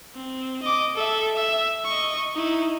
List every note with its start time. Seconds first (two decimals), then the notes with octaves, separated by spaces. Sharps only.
0.15 C4
0.62 D#5 D6
0.95 A4 E5
1.36 E5
1.85 D#5 C#6
2.35 D#4 E4